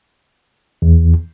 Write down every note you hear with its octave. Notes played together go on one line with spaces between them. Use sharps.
E2